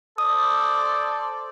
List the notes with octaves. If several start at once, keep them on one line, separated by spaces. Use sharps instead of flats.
A4 C5 D5 D#6